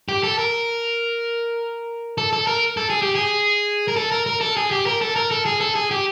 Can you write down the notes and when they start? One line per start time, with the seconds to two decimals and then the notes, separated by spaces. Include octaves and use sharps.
0.09 G4
0.23 A4
0.39 A#4
2.18 A4
2.33 A4
2.47 A#4
2.77 A4
2.90 G#4
3.02 G4
3.15 G#4
3.88 A#4
3.96 A4
4.12 A#4
4.26 A#4
4.41 A4
4.57 G#4
4.71 G4
4.86 A#4
5.01 A4
5.16 A#4
5.31 A4
5.46 G#4
5.60 A4
5.75 G#4
5.91 G4